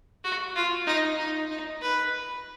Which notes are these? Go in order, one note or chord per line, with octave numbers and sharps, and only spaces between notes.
F#4
F4
D#4
D#4
D#4
B4